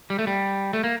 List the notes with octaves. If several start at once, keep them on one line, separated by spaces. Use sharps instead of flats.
G3
A3
G3
A3
A#3